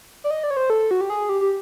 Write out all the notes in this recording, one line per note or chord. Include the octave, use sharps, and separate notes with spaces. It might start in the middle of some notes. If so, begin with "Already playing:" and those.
D5
D#5
D5
C#5
C5
A4
F#4
G4
G#4
G4
G4